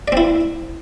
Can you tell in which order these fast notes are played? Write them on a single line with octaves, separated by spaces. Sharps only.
D5 C4 E4